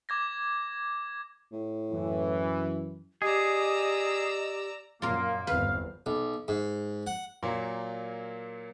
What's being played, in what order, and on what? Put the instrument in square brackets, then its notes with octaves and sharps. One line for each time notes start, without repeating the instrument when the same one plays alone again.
[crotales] D6 G#6 A#6
[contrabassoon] A2
[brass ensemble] F#2 E3
[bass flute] G4 [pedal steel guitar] G#4 [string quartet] D5 A#5 E6 [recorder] D#5
[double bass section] F#2 A#2 [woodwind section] A#3 [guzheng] F4 A#4
[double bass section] G1 E2 C4 [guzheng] B4 [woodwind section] F5
[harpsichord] B1
G#2
F#5
[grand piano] A#2 F#3 A#3